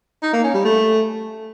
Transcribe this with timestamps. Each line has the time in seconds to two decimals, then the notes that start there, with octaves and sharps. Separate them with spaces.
0.23 D#4
0.33 A#3
0.44 C#4
0.54 G3
0.65 A3